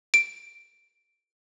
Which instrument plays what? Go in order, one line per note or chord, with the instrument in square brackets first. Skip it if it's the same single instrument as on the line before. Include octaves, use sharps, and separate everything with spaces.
[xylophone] D7